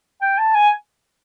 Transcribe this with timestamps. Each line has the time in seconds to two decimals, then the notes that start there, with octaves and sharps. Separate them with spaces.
0.22 G5
0.38 A5
0.55 G#5